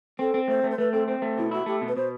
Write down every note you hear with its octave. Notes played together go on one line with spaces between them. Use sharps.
C4 A4
C4
A3 C5
A3
C5
A3 B4
C4 A4
C4 C5
A3
B2 E4
E4 F#4
A3 G4
B2
B4
B2 C5